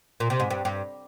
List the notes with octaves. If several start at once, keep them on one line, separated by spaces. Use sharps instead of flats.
A#2
C3
G#2
G2
G2